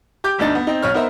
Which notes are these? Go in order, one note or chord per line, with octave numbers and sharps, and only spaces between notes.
G4 D6 G6
G1 D2 D4 D#4 A6
B3
C4 D#4
B1 C#5 F6
B3 D#4 A#4 C5 E5